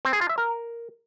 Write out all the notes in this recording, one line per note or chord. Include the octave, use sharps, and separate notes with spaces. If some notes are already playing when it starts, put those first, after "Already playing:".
C4
G#4
F4
E5
A#4